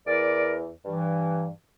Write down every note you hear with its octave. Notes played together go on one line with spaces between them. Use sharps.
E2 E3 A#4 D5
G2 E3